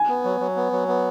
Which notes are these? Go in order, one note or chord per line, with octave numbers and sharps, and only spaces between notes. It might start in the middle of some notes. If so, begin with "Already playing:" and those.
Already playing: G#5
B3
F#3
F#3
B3
F#3
B3